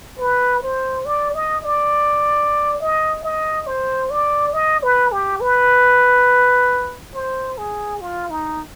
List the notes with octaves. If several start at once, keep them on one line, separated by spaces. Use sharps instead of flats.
B4
C5
D5
D#5
D5
D#5
D#5
C5
D5
D#5
B4
G4
B4
C5
G#4
F4
D#4